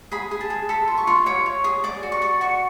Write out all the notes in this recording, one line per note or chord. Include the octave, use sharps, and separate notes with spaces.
G#4 B5
G#4
A5
G#4
A4 B5
F4
C#6
F4
C#5 D6
C#5
G#4
D5 D6
F#4
C#6
D5
F#4 C#6